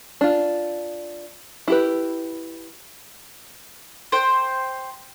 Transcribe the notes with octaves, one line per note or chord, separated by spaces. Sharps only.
D4 F4
E4 G4 B4
C5 G5